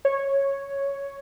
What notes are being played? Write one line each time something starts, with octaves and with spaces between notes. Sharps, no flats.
C#5